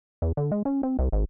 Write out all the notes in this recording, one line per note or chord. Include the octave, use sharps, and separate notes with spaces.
E2
D3
G#3
C#4
C4
C2
G#1